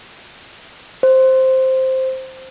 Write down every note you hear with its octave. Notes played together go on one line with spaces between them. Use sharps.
C5